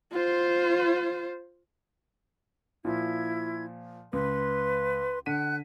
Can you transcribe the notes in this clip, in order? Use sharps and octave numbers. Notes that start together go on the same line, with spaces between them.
F4 C5
A#2 F3 E4 G#6
C#2 B4 C6
D3 F#5 F#6 B6 D#7